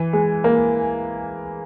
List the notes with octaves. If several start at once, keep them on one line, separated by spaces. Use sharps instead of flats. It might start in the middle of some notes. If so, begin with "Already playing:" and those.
Already playing: E3
G#3
A#3